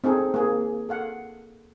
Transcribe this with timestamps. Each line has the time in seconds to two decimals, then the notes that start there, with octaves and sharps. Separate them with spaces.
0.04 C4 D#4 G#4 A4
0.34 A#3 G#4
0.89 A4 F5 F#5